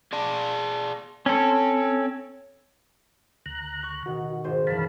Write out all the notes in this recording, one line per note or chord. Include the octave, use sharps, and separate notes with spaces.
G#4 D5 A5
C4 C#4 A4
D2 A#5 F#6
C#6
B2 D#3 F#4
G#1 C5
F#2 B2 E3 F5 A5 B5